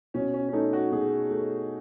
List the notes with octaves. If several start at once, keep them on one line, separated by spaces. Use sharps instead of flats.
B2 C#4
C#4
C#4
A3 D#4
F#4
B2 G#4
A3